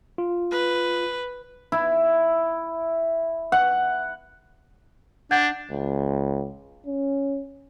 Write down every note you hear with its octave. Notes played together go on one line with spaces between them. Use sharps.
F4
B4
E4
F#5
D4 F#5 G6 G#6
C#2
C#4